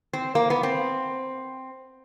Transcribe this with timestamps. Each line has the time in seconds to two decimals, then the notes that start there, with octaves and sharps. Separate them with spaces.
0.13 C4
0.35 A#3
0.50 B3
0.63 C4